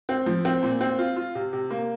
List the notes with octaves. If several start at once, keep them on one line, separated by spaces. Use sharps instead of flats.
C4
F3
C4
A#2
C4
F4
F4
C3
C3
A#3